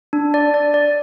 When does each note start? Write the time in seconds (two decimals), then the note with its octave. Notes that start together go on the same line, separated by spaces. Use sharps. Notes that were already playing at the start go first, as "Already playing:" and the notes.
0.13 D4
0.34 D5
0.54 D5
0.74 D5